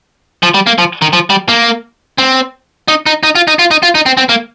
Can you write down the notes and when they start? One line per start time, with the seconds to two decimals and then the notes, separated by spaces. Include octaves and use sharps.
0.43 F3
0.54 G3
0.67 A#3
0.78 F3
1.02 D#3
1.13 F3
1.30 G3
1.49 A#3
2.18 C4
2.88 D#4
3.06 D#4
3.23 D#4
3.35 F4
3.48 D#4
3.59 F4
3.71 D#4
3.83 F4
3.95 D#4
4.06 C4
4.17 C4
4.29 A#3